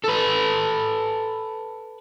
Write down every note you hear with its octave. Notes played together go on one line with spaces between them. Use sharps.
A4 B4